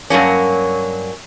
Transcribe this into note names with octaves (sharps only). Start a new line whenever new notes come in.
G2 F#3 A#3 C#4